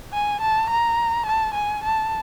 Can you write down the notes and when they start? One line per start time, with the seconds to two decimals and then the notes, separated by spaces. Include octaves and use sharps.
0.13 G#5
0.41 A5
0.70 A#5
1.26 A5
1.54 G#5
1.84 A5